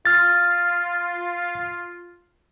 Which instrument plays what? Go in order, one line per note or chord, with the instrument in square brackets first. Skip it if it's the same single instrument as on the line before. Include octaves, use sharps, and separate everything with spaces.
[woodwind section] F4 [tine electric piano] F6 A6